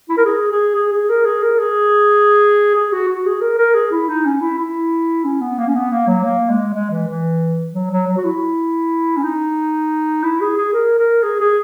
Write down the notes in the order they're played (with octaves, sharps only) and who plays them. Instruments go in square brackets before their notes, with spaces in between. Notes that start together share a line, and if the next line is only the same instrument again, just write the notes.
[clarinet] E4
A#4
G#4
G#4
G#4
G#4
A#4
G#4
A#4
G#4
G#4
F#4
F#4
G#4
A#4
A#4
G#4
E4
D#4
C#4
E4
E4
C#4
B3
A#3
C#4
B3
A#3
F#3
A#3
G#3
G#3
E3
E3
F#3
F#3
F#3
F#4
E4
C#4
D#4
E4
G#4
G#4
A#4
A#4
G#4
G#4